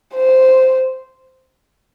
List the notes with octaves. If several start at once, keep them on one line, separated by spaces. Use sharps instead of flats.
C5